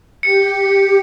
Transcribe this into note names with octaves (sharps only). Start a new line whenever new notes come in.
G4 C#7